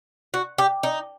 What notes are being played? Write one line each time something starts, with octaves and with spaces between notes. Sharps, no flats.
F#4
G4
D#4